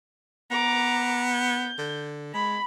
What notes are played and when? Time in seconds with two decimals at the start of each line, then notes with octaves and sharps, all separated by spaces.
0.51 B3 A#5 D6
1.31 G6
1.78 D3
2.34 G#3 B5